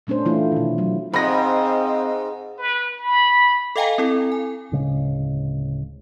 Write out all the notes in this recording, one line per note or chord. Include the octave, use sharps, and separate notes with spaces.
A#2 A3 C#4 D4 C5
E3 A3 E4 F4
B2 D#3
F#3
G#2 C4 D#5 F5 B5 A#6
B4
B5
A4 D#5 F5 G5 G#5 A#5
C4 E4 A4
G#5
D1 C#3 G#3